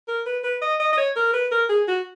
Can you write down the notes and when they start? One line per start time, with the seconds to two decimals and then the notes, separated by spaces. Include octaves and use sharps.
0.08 A#4
0.26 B4
0.44 B4
0.62 D#5
0.80 D#5
0.93 D#5
0.98 C#5
1.16 A#4
1.33 B4
1.52 A#4
1.69 G#4
1.88 F#4